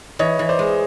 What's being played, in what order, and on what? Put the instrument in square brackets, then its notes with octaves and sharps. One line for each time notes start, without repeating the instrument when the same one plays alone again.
[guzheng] E3 [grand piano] C#5 D#5
[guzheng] E3
[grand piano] C5 D5
[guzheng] G#3